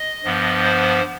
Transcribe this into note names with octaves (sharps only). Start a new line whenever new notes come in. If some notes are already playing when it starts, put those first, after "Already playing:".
Already playing: D#5
G2 F3 B3
C5